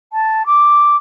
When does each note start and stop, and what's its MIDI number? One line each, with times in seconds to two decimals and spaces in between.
0.12 0.45 81
0.46 0.96 86